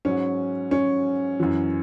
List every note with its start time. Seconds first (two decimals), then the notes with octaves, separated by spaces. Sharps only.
0.05 G#2 F#3 C#4
0.71 C#4
1.39 F#2 E3